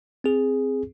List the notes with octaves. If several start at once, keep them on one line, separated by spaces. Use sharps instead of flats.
C4 G#4